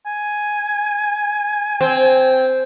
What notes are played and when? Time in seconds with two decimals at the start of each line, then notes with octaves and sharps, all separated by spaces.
0.06 G#5
1.81 C4